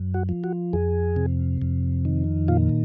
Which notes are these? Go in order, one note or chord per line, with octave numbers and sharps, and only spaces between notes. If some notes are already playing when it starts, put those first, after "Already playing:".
Already playing: F#2
F#4
F3
F#4
F2 G#4
C3
F2
D#3
A#2 F4